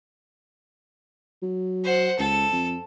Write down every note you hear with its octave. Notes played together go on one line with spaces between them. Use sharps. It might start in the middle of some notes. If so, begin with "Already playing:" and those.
F#3
C5 F#5
C#2 A4
F2